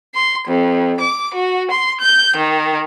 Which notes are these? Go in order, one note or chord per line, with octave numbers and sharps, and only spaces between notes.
C6
F2
D6
F#4
C6
G6
D#3